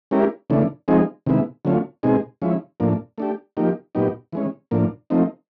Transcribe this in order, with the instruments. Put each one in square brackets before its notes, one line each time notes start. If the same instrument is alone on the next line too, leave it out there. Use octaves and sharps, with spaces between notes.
[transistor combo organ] G#3 C#4 E4 G4 A#4
C#3 E3 A3 D4
F3 G#3 C4 D#4 G#4
C3 D#3 G#3 B3 E4
D3 F#3 A3 C#4 F4
B2 G#3 C4 D#4 G#4
F3 G#3 C#4 E4
A2 F3 A#3 D4
A3 D4 G4
F3 A#3 D#4 G4
A#2 F#3 B3 D#4 G4
E3 G#3 C#4
A2 F3 A#3 D4
F3 A3 C4 D#4